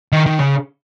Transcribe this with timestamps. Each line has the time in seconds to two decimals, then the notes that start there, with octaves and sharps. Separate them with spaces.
0.12 D#3
0.26 D#3
0.40 C#3